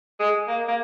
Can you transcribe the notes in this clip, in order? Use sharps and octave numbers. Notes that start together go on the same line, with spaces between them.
G#3
A#3
A#3